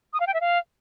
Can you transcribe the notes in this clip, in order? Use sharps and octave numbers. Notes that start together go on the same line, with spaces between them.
D#6
F5
G5
E5
F5